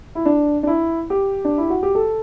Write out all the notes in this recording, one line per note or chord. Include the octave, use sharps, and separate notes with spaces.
E4
D4
D4
E4
G4
D4
E4
F#4
G4
A4